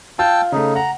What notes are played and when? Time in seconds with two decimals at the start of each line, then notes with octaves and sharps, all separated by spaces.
0.19 F4 G5 A5 E6
0.52 C#3 A3 D#4
0.76 F#5 A#5